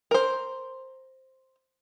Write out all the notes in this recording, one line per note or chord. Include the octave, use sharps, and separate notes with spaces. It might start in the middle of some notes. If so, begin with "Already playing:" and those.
A#4 C5